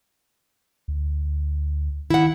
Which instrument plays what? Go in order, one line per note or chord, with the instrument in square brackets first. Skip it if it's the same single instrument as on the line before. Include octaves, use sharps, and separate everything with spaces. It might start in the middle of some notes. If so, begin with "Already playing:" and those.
[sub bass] D2
[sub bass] D#3 [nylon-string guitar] E4 F#5